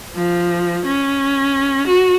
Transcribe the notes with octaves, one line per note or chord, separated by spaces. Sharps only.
F3
C#4
F#4